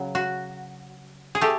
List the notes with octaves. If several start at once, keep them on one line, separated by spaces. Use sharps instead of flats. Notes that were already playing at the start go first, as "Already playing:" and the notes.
Already playing: C#3 F#3
F#4
G#4
A3 G4